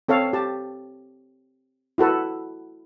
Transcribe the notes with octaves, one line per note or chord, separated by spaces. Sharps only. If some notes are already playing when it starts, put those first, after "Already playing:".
C4 A4 C#5 F5
G4 A5
E4 F#4 A4 B4